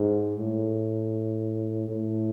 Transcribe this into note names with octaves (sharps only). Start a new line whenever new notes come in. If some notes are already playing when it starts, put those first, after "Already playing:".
Already playing: G#2
A2
A2